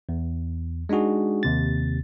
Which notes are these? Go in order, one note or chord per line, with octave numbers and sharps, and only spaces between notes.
E2
G#3 D4 D#4 F#4 G#4
D#2 C3 A6